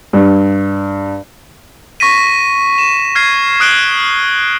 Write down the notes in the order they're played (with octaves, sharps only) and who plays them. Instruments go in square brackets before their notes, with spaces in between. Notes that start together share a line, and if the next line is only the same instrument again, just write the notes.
[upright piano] G2
[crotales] C#6 A#6 B6 D#7
E7
F6 G#6 C7
D#6 F#6 D7 G7